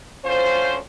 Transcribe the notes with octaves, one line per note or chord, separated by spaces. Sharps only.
D2 C#4 F4 C5